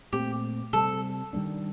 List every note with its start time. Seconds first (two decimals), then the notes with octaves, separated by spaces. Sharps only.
0.13 A#2 A3 C4 G4
0.73 C3 G3 C4 A4
1.33 D#3 G3 A#3 D4